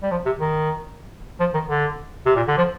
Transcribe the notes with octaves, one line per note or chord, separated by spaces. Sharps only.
G3
F3
C3
D#3
F3
D#3
D3
C3
A#2
D3
F3